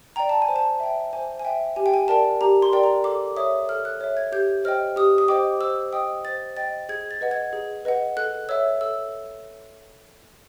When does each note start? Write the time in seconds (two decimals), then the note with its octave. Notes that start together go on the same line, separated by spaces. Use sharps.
0.16 D5 G5 A#5
0.29 A5
0.42 G#5
0.49 C5
0.56 A5
0.80 E5 G5
1.13 C5 G#5
1.39 G#5
1.45 E5 G5
1.76 G4 G#5
1.86 G5
1.94 G#5
2.08 A#4 D5 G5 A5
2.41 G4 A#5
2.62 C6
2.73 A#4 D5 G5
2.84 A#5
3.04 A4 D6
3.37 C#5 E5 D#6
3.69 A4 F6
3.85 F#6
4.01 C#5 E5
4.17 G#6
4.32 G4 G6
4.64 C5 D#5 G5 F6
4.96 G4 D#6
5.18 D#6
5.28 C5 D#5 G5 D6
5.61 C5 E6
5.93 D#5 G5 D#6
6.25 C5 A6
6.57 D#5 G5 A6
6.89 G#4 G#6
7.11 A6
7.21 B4 D#5 F#5
7.31 G#6
7.53 G#4
7.85 B4 D#5 F#5
8.17 A4 F#6
8.49 C#5 E5 E6
8.81 A4 E6